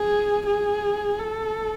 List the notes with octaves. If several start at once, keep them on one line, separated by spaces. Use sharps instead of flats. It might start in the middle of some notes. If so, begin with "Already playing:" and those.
Already playing: G#4
G#4
A4